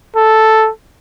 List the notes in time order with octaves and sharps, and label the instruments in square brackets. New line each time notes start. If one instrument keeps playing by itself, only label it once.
[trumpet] A4